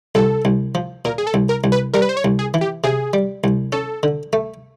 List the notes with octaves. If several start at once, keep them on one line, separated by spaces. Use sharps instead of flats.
C2 A4
C2
F3
A#2 A#4
G#4
A4
C2
A#4
C2
B4
G3 A#4
B4
C5
C#5
C2
G#4
E3
G4
C3 G#4
G3
C2
C#4 A4
D3
A3